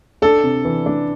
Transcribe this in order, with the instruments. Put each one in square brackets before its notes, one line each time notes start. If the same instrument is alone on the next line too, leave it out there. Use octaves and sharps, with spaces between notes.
[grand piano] D4 [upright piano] A4
[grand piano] C3
E3
D4